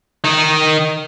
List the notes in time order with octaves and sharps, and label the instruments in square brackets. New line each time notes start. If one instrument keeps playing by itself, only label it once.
[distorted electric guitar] D#3 D#4